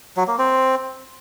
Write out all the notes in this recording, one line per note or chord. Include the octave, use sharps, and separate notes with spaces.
F#3
A#3
C4